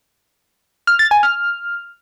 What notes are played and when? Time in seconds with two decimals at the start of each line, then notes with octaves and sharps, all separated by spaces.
0.87 F6
0.99 A6
1.11 G#5
1.23 F6